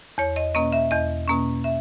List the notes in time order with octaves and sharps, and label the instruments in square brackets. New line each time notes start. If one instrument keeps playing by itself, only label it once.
[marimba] E2 C#5
D#5
B2 A#3 C#4 D#5
E5
E2 D#5
B2 A#3 C#4
E5